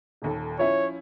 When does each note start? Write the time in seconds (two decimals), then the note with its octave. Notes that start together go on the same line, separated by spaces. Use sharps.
0.22 D#1 D#2 A4
0.59 F3 C#4 E4 C#5